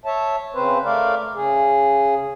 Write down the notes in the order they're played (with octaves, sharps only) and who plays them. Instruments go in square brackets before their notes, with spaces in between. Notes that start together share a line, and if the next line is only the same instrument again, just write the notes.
[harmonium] C#5 E5 A5
C#3 C4 B4 C5
A3 A#4 D5 F5
C#3 G#4